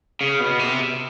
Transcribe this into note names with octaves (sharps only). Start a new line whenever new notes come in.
C#3
B2
C3